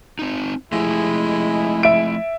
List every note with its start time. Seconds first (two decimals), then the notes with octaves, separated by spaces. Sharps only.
0.19 C4 D#4
0.72 F3 G#3 A3 E4 G4
1.83 E5 D7